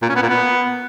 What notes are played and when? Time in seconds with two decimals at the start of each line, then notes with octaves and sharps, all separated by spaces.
0.02 A#2
0.09 C#4
0.16 B3
0.23 A#2
0.29 B3